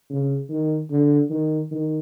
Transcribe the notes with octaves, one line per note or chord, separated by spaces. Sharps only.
C#3
D#3
D3
D#3
D#3